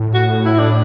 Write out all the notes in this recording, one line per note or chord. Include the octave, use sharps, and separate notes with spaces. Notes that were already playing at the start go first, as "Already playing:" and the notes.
Already playing: A2
F#4
E4
D4